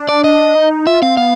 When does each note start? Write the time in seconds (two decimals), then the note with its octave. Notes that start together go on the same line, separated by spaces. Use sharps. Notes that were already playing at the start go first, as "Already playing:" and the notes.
Already playing: D4
0.09 D5
0.24 D#5
0.55 D#4
0.86 F4 E5
1.02 C4 F5
1.17 B3 F5